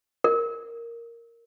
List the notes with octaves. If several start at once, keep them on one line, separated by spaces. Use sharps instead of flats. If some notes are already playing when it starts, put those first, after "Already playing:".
A#4